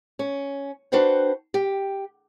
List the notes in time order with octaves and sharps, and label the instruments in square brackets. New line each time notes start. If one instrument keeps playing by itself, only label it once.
[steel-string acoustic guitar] C#4
D4 F#4 B4 C5 G5
G4